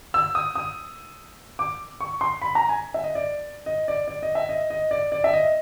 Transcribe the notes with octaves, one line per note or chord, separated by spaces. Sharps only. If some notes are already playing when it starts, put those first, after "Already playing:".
E6
D#6
D#6
D6
C#6
C6
B5
A#5
G#5
E5
D#5
D5
D#5
D5
D5
D#5
E5
D#5
D#5
D5
D5
E5
D#5